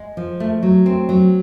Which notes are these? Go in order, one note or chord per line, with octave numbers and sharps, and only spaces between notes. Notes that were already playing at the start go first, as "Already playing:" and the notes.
Already playing: G#3
F3
A3
F#3
C4
F#3